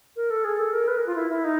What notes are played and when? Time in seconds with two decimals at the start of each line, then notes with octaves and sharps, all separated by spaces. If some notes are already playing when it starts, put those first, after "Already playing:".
0.16 A#4
0.30 A4
0.44 G#4
0.59 A4
0.73 A#4
0.88 B4
0.97 A#4
1.06 F4
1.16 E4
1.30 E4
1.44 D#4